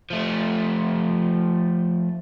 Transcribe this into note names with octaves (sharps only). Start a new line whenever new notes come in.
F3 A3